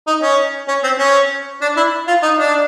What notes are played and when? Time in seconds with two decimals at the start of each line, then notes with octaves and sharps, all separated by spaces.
0.07 D#4
0.22 C#4
0.68 C#4
0.84 C4
0.99 C#4
1.62 D4
1.76 E4
2.07 F4
2.23 D#4
2.39 D4